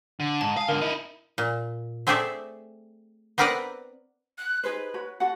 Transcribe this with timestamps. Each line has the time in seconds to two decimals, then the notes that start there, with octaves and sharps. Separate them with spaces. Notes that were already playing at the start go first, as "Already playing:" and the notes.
0.20 D3
0.41 G#2 A5
0.57 F5 G#5 D#6
0.68 G#2 D3 A#4
0.81 D#4 E4 B5
1.38 A#2
2.07 A3 C4 G#4 A4 D5 E5
3.38 B3 C4 A#4 B4 D5 F#5
4.38 F#6
4.64 D#4 G#4 B4 C5
4.94 F#4 C#5 B5
5.20 F#4 A4 F#5